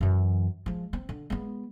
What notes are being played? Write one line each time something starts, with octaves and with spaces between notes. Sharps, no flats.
F#2 E3
F3 G#3
C4
D3
G#3 B3